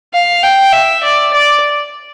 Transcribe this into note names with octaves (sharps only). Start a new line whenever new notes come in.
F5
G5
E5
D5
D5